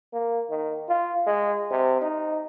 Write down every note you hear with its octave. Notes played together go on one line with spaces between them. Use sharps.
A#3
D#3
F4
G#3
C3
D#4